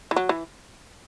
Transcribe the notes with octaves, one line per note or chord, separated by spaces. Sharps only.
E3
F#3
E3